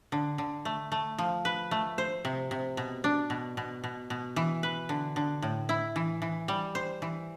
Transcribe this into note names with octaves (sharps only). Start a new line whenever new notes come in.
D3
D3
A3
A3
F3
B4
A3
C5
C3
C3
B2
D4
B2
B2
B2
B2
E3
B4
D3
D3
A2
E4
E3
E3
G3
C5
E3